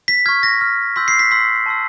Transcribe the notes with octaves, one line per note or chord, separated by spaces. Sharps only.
B6
C#6 F6 G#6
A#6
C#6 F6
C6 E6 G6 B6
C7
B6
C6 E6 G6 B6
A5 C6 E6